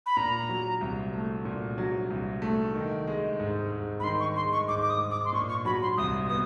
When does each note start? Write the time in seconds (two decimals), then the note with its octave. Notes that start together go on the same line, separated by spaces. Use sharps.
0.06 B5
0.17 A#2 A#5
0.49 F#3
0.81 C2
1.13 A3
1.45 A#2
1.78 F#3
2.10 C2
2.42 A3
2.75 D#3
3.07 G#3
3.40 G#2
3.72 G#2
4.00 B5
4.04 D#3 C6
4.20 C#6
4.36 G#3 C6
4.52 C#6
4.68 G#2 D6
4.81 D6
4.90 D#6
5.00 G#2
5.11 D6
5.25 C6
5.33 A#2 C#6
5.49 C#6
5.65 F#3 B5
5.82 C6
5.97 C2 D#6
6.29 B3 D#6